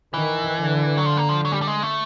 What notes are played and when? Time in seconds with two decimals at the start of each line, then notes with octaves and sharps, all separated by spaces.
0.14 D#3 E3
0.60 D3
0.97 F#3
1.06 F3
1.17 A#3
1.29 F3
1.45 F#3
1.52 G3
1.62 G3
1.67 G#3
1.83 A3